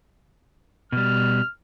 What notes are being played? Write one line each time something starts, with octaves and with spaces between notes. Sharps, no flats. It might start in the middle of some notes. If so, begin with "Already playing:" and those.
B2 G3 F6